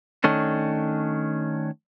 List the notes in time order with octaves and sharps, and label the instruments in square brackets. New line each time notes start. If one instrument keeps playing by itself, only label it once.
[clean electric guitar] D#3 A3 C#4 D4